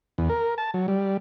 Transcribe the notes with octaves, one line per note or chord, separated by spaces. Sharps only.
E2
A#4
A5
F#3
G3